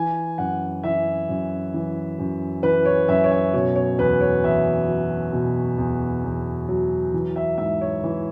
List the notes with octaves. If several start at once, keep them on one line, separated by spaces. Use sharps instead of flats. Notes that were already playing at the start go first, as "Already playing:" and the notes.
Already playing: E3 G#5
F#2 F#5
E3 E5
F#2
E3
F#2
E3 B4
C#5
F#2 E5
C#5
E5
B2 C#5
C#5
E2 B4
C#5
E2 E5
F#3
B2
E2
E2
F#3
E3
E5
G#2 E5
C#5
E3